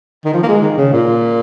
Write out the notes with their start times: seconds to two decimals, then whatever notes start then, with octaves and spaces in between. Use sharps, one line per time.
0.25 D#3
0.34 F3
0.43 A#3
0.48 G#3
0.62 D#3
0.78 C#3
0.93 A#2